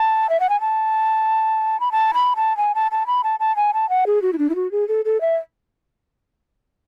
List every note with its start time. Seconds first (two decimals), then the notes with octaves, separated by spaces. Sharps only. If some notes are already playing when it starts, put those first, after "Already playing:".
Already playing: A5
0.29 E5
0.40 F#5
0.49 G#5
0.61 A5
1.80 B5
1.92 A5
2.14 B5
2.36 A5
2.57 G#5
2.75 A5
2.91 A5
3.07 B5
3.24 A5
3.40 A5
3.56 G#5
3.74 A5
3.90 F#5
4.07 G#4
4.22 F#4
4.33 E4
4.38 D4
4.50 E4
4.55 F#4
4.72 G#4
4.88 A4
5.05 A4
5.21 E5